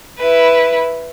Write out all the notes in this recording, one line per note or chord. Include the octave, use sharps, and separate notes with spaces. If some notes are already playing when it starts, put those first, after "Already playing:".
E4 B4